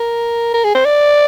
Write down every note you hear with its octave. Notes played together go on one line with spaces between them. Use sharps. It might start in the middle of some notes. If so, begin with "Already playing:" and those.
Already playing: A#4
A#4
G#4
C5
D5